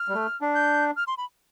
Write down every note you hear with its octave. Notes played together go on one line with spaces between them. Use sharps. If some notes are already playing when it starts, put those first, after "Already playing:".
Already playing: F6
G3
A3
D4
G6
F6
C6
B5